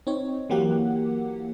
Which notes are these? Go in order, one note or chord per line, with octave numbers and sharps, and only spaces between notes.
C4 D#4 C#5
E3 F#3 A#3 G4 F#5